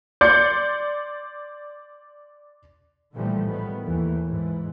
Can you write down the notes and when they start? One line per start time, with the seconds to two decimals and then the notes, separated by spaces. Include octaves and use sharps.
0.21 D5 C6 G6 C#7
3.15 A#2 D3 E3 F3 G3 A3
3.47 A2 D#3 G3 B3
3.82 D#2 E3 A3
4.25 G#2 E3